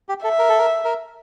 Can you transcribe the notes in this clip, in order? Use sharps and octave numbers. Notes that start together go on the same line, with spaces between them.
G4
A4 E5
A#4
A4
A#4
A#4